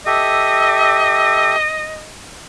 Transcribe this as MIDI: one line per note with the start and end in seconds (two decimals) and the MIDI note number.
0.06 1.56 67
0.06 1.56 69
0.06 2.11 75
0.06 1.56 76